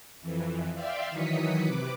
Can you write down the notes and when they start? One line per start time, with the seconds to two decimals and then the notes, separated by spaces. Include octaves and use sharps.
0.21 F2 E3
0.74 D5 E5 F5 G5 C6
1.10 D#3 E3 F#3 D#6 B6 C#7
1.62 C3 B4 D6